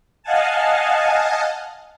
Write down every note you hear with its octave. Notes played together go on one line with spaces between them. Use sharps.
D#5 F5 F#5 G#5 A5